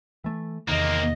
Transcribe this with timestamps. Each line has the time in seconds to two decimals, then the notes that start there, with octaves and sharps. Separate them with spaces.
0.24 E3 A3
0.68 E2 C3 D#3 A#3 C4 D#5